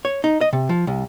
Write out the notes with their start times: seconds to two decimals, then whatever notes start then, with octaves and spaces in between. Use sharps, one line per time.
0.05 C#5
0.24 D#4
0.41 D#5
0.53 C3
0.69 F3
0.87 C2